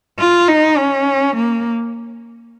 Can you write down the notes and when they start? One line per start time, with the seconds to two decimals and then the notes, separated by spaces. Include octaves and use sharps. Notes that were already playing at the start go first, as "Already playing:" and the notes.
0.19 F4
0.48 D#4
0.78 C#4
1.36 A#3